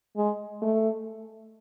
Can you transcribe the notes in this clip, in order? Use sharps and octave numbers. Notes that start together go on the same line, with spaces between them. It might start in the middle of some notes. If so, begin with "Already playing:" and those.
G#3
A3